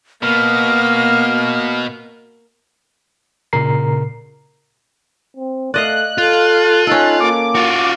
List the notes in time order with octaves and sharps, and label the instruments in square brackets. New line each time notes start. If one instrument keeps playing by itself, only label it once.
[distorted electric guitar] B2 [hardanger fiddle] A#3 [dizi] F6
[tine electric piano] A#2 C#3 A#4 A#5 C7
[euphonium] C4
[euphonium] A3 [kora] D5 D#5 F5 [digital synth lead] F#6
[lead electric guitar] F4 [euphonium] A4
[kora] C#4 A4 [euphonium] D#4
[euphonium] A#3 [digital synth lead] D6
[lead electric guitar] F4 F#4